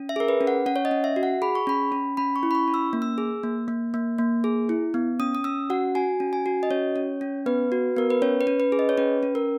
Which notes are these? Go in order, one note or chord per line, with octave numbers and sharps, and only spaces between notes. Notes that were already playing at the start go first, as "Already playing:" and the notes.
Already playing: C#4
E5
G#4 A#4
B4
C#4
F#5
C#4 F#5
C#5
D#5
C#4
E5
F#4
F#5
G#4 B5
C#6
C#4 B5
C#4
C#4 B5
C#6
E4
B5
C#6
C#4
E6
A#3
E6
G#4
A#3
A#3
A#3
A#3
G#4
E4
B3
C#4 D#6
D#6
C#4 E6
F#4 F#5
F#4 G#5
C#4
G#5
F#4
D#5
C#4 C#5
C#4
C#4
B3 B4
F#4
B3 A#4
B4
C#4 C#5
B4
C#4
B4
G#4
D#5
C#5
C#4 B4
C#4
A#4